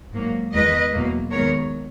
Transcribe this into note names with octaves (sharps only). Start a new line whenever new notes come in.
G#2 F#3 A#3
E2 D#3 G#3 B4 D#5
E2 B2 F#3 A#3
D#2 D#3 G#3 B3 A#4 C#5